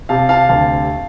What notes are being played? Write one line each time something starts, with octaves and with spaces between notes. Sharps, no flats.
C3 F5 A5
F5 A5
D2 F5 A5